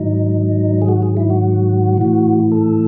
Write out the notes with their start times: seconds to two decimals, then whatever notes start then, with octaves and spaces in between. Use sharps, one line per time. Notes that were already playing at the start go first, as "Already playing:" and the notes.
Already playing: G#2 D#3 F#3 D#4
0.82 G#4
0.88 F#4
1.02 G#4
1.17 E4
1.30 F#4
1.98 A2 E3
2.52 A4